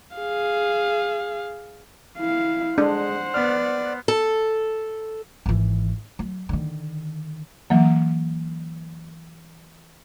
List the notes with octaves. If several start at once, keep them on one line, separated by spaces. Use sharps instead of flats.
G#4 F5
E4 F5
G#3 D4 C5 F#5
B3 D5 F6
A4
G#1 E3
F#3
D3 D#3
E3 F#3 A#3